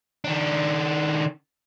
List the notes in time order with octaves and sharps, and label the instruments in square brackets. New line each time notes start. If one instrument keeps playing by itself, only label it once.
[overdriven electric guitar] D#3 D4